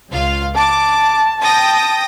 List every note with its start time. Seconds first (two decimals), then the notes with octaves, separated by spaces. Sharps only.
0.10 C#2 F4 F5
0.56 A5 D6
1.42 G5 A5 D#6 A#6